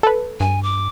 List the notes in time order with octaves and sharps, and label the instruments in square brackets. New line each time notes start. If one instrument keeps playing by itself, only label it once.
[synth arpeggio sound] A4 B4
[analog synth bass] G2 [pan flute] G#5
[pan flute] D6